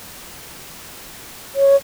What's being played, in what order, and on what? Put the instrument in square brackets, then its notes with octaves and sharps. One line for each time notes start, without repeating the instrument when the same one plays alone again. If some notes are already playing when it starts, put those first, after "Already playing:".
[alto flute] C#5